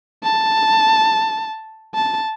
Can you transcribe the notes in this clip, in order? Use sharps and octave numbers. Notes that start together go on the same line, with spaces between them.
A5
A5